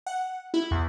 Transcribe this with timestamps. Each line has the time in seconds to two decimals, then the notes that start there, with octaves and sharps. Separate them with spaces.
0.06 F#5
0.54 E4
0.71 E2